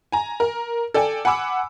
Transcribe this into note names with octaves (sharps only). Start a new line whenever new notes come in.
G#5 A#5
A#4
A4 D5 G5 G#5
F#5 G#5 B5 D6 E6